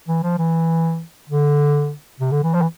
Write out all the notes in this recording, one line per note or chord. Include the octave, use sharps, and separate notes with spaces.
E3
F3
E3
D3
C3
D3
E3
F3
E3